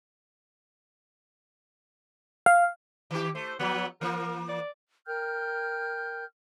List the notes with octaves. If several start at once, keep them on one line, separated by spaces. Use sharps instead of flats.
F5
D#3 G4
A3 C5
F3 F#3 B3
E3 A#3 A#4
D5
A#4 G5 F6 G6